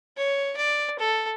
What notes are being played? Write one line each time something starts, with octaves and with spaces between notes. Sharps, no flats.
C#5
D5
A4